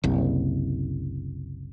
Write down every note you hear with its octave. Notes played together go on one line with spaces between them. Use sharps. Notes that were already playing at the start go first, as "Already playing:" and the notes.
F#1 C2